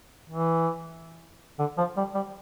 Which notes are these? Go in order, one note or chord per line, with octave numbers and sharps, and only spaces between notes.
E3
D3
F3
G3
G3